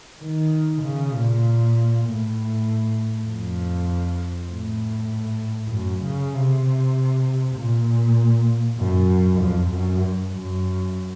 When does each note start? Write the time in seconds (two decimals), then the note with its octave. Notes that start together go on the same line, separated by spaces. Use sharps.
0.20 D#3
0.82 C#3
1.12 A#2
2.05 A2
3.27 F2
4.50 A2
5.71 F#2
6.03 C#3
6.34 C3
7.55 A#2
8.78 F#2
9.40 F2
9.70 F#2
10.31 F#2